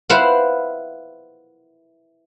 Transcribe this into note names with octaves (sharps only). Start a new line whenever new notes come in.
E4 B4 C5 F5 F#5